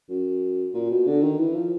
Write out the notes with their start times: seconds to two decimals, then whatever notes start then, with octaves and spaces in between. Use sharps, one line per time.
0.09 F#2
0.74 A#2
0.90 B2
1.06 D3
1.21 D#3
1.38 E3
1.54 F3